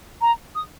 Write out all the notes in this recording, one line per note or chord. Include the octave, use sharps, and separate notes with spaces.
A#5
D#6